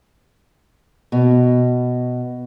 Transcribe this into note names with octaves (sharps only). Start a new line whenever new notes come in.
B2